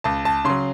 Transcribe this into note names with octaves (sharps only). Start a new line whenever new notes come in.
C#2 A5
A5
C#3 F#3 C6